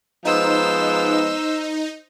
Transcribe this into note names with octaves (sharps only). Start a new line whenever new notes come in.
F3 G#3 B3 D#4 C5 E6